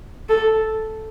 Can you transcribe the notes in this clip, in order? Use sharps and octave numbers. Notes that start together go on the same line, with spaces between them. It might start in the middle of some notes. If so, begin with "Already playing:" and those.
A4